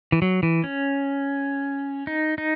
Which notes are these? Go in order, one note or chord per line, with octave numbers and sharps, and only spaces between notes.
E3
F#3
E3
C#4
D#4
D#4